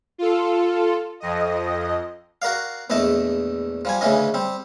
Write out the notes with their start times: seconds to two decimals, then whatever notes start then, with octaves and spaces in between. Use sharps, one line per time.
0.18 F4 A4
1.20 F2 D#5
2.42 F#4 A#4 D5 F5
2.90 A#1 E2 A3 D#5 A5
3.85 F3 G3 G#5
4.01 D2 A2 C#3 E3 C#4 D#5
4.34 G3 C4